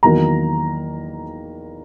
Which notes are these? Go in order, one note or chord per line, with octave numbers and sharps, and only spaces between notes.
E2 D#3 F#3 A#3 A#5